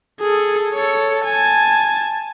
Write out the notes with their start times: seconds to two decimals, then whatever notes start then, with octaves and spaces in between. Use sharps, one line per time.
0.21 G#4 A4
0.74 A4 C#5
1.25 G#5 A5